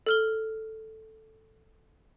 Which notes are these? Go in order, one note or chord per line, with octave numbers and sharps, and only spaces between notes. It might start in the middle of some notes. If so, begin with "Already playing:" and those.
A4 F6 G7